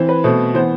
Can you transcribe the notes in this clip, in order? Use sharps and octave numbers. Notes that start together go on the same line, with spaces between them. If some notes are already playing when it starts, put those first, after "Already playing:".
Already playing: E3 C4
B4
B2 A3 C4
E3 B3 C5